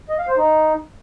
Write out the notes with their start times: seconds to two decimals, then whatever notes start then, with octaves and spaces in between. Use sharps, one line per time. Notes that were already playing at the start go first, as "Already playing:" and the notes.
0.09 D#5
0.19 F5
0.28 C5
0.37 D#4